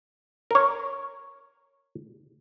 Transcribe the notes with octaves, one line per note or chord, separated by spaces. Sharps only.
A#4 C#5